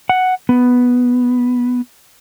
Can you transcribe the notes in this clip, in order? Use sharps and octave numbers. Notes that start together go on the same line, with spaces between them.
F#5
B3